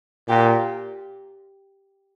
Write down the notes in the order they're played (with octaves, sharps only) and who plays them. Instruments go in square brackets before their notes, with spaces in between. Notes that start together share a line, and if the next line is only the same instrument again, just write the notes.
[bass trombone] A#2 [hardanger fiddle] G4